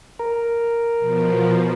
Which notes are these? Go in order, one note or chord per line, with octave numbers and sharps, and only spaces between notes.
A#4
B2 F3